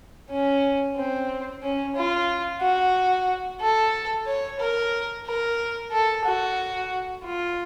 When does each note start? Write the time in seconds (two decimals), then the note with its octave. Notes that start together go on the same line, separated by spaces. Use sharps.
0.30 C#4
0.96 C4
1.63 C#4
1.96 F4
2.61 F#4
3.60 A4
4.26 C#5
4.60 A#4
5.26 A#4
5.92 A4
6.25 F#4
7.24 F4